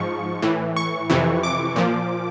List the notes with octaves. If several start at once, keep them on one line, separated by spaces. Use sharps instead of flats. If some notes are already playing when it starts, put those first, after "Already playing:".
Already playing: G#2 F3 C#6
A2 E3
C#6
F2 C3 E3
D6
A#2 F3